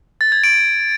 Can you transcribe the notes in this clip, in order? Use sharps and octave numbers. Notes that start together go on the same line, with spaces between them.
A6
G#6
D7